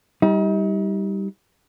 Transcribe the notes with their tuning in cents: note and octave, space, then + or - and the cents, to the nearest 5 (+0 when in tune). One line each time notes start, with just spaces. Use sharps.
G3 +0 D#4 +40